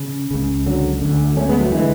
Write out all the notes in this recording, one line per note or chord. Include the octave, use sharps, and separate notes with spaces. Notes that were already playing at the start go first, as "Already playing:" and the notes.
Already playing: C#3
C#2 C#3
D3 F#3
D2 D3
A3 C#4
G#3 B3
F#3 A3
D3 E3 G#3